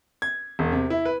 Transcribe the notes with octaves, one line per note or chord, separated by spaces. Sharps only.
G#6
E1
C3
E4
B4